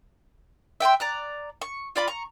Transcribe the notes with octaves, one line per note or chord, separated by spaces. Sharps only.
E5 G5 G#5 C6
D5 A#5 F#6
C#6
F4 D5 B5
A#5 C#6